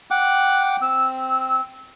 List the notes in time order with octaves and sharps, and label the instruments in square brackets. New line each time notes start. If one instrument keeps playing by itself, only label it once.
[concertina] F#5 G5 D6 [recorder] F#6
[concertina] C4 [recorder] E6